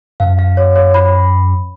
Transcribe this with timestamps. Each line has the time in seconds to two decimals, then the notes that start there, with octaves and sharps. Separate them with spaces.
0.20 F#2 F5
0.39 F5
0.57 C#5
0.76 C#5
0.94 B5